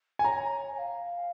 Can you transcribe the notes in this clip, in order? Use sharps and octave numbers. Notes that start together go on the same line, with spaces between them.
G#5
C#5 A#5
G#5
F5